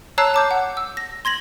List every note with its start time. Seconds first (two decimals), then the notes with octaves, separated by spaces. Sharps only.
0.18 C#5 A5 A#5 E6 F#6 C7
0.34 A5 D6 G6
0.51 F#5
0.77 E6
0.97 A#6
1.25 C6 G#6 A#6 F#7